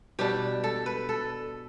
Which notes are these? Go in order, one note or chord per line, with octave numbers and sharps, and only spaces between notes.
B2 G3 D4 G4
A4
B4
A4